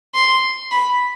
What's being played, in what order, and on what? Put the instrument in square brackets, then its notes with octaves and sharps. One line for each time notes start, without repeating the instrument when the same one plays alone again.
[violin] C6
B5